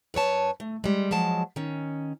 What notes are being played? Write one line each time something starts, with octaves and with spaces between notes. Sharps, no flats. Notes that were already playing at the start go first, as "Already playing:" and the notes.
F#2 B4 C#5 A5
A3
G3 G#3
F3 F#3 G#3 A5
D#3 C#4